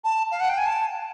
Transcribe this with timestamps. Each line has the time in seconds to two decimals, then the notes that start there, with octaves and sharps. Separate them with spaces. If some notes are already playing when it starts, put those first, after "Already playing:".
0.04 A5
0.31 F5
0.40 F#5
0.49 G5
0.58 G#5
0.66 A5